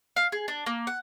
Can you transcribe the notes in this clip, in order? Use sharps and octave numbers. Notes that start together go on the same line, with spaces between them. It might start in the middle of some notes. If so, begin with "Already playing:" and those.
F5
G#4
D4
A#3
F#5